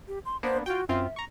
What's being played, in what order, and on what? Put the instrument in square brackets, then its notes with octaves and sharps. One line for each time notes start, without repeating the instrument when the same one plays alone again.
[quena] G4
C6
[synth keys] A#3 B3 D4 [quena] C5
[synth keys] F4 G5 [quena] F#4
[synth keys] F#2 C4 F4 [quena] E5
[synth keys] A#5 C#6